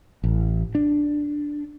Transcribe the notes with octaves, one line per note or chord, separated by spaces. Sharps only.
A1
D4